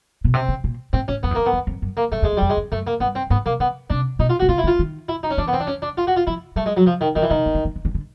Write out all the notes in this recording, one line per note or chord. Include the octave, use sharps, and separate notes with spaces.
B2
C3 C4
C#3
A#2
A2 C4
A2 C#4
F2 B3
E2
F2 A#3
B3
E2
F2
F#2
A#3
F#2 A3
E2 G#3
E2
F2 G3
G#3
F2
F#2 A3
A#3
G2 B3
C4
G#2 B3
C3 A#3
C#3 B3
C3 D4
B2 D#4
F4
C3 F#4
C#3 F4
E4
D3
F4
D#3
E4
D#4
C#4
E3 D4
B3
C4
D4
C#4
D4
F4
F#4
F4
F3 E4
G3 A3
G#3
F#3
F3
D#3
D3 D#3
E3
C3 D#3
C#3
D3
D#3
D3
D#3
D3